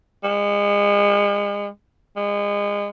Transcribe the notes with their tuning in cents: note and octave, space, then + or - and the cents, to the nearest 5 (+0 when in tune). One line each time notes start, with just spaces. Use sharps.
G#3 -35
G#3 -30